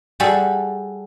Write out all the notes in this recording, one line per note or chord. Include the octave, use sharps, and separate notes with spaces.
G3 F#4 G#4 A4